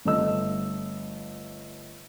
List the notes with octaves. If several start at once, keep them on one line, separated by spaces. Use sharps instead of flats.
G1 A3 D#5 E6